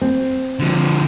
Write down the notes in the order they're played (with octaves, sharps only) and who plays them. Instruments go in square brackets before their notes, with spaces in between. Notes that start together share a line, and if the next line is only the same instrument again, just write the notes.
[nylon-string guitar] C4
[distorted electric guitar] D3 F3